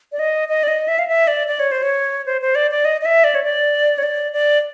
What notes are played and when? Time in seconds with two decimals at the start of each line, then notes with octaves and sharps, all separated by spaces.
0.12 D5
0.19 D#5
0.49 D#5
0.63 D5
0.68 D#5
0.88 E5
0.99 F5
1.08 E5
1.27 D5
1.47 D5
1.59 C#5
1.71 C5
1.83 C#5
2.26 C5
2.41 C5
2.55 D5
2.71 D5
2.85 D#5
3.01 D#5
3.05 E5
3.24 D5
3.35 C#5
3.43 D5
3.98 C#5
4.03 D5
4.32 D5